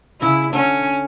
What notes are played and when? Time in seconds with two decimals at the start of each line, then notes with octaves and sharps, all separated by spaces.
0.21 C#3 E4
0.53 D3 C#4